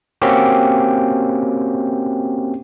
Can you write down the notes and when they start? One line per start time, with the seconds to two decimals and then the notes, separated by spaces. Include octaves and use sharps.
0.22 A#3 C4 C#4 F#4 G4